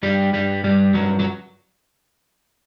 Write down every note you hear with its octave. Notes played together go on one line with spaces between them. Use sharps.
G2 G3
G2 G3
G2 G3
G2 F#3
F#3